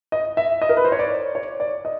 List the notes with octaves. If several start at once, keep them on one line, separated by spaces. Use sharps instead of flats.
D#5
E5
D#5
A#4
B4
C5
C#5
D5
C#5
D5
D#5